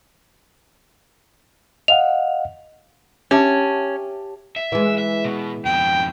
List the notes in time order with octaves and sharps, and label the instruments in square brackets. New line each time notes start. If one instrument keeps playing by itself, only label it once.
[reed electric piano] D#5 F5 F#5 [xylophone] F7
[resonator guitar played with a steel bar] C#4 [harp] G4 E5 A5
[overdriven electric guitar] E5
[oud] E3 G#3
[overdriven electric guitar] E5
B2
[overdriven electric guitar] F2 B2 [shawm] G5